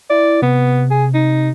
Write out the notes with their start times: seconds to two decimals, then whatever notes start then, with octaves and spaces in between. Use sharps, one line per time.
0.10 E4 D5
0.42 C3 B3
0.91 G#4
1.14 D#4